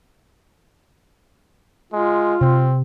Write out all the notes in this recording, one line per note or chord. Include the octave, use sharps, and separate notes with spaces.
G#3 F4
C3 C4